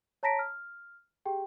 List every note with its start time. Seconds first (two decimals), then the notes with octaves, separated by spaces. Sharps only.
0.23 C#5 A5 A#5 A#6 B6 D7
0.39 F6
1.26 G4 G#4 G5